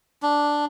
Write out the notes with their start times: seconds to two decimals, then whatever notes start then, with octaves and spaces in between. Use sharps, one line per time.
0.23 D4